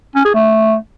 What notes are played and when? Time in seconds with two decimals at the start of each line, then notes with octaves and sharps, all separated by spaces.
0.15 C#4
0.25 G#4
0.35 A3